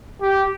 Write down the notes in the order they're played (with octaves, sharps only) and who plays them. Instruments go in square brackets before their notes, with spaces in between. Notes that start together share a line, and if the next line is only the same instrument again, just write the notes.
[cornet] G4